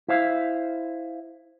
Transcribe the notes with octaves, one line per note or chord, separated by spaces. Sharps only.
E4 C5 F5